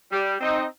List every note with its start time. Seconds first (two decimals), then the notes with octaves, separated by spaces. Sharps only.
0.12 G3
0.41 C4 D#4